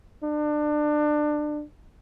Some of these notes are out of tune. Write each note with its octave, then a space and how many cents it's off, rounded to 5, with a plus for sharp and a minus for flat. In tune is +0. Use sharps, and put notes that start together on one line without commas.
D4 +25